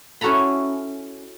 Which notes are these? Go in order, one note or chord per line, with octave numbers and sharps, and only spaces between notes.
C#4 E4 F#4 A4 A#5 B5